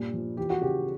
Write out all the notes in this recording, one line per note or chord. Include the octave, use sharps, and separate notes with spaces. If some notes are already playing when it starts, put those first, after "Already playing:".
Already playing: G2 A#2
F3
E3 G4
F#4
C#3 G4